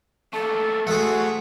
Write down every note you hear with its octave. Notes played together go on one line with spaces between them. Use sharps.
A3 A#3 A4
A3 F#4 G#4 C5 F#5